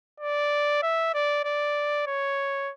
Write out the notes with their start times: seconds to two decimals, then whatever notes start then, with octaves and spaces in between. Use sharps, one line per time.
0.20 D5
0.82 E5
1.14 D5
1.44 D5
2.07 C#5